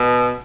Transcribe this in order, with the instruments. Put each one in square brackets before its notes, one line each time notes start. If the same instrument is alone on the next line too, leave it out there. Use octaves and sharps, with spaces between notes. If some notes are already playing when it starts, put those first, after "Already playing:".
Already playing: [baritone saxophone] B2